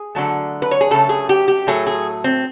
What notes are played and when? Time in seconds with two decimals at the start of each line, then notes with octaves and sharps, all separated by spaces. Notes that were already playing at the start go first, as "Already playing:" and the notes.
Already playing: G#4
0.15 D3 F#3 A3
0.62 B4
0.71 C#5
0.81 G#4
0.91 C#3 F#3 A3 A4
1.09 G#4
1.29 G4
1.48 G4
1.67 A2 F#3 A3 G#4
1.87 G#4
2.24 C4